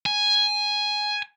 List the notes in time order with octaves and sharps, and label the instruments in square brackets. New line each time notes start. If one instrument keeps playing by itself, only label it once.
[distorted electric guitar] G#5